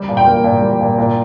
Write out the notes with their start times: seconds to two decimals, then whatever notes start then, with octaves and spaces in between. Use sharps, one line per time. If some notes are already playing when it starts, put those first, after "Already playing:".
Already playing: G3
0.08 A#2
0.17 G5
0.26 A#3
0.44 A#2
0.61 G3
0.80 A#2
0.98 A#2